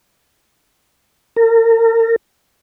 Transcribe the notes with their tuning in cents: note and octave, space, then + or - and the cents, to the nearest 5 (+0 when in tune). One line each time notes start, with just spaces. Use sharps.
A#4 -35